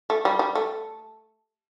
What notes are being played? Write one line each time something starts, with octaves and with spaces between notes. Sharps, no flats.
A3
G3
G3
A3